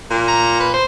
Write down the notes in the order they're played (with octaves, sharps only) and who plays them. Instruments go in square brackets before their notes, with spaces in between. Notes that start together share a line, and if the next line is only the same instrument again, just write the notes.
[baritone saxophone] A#2
[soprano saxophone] A#5
B4
C5